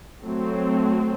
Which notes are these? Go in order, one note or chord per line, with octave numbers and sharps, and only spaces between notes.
F#3 A3 C4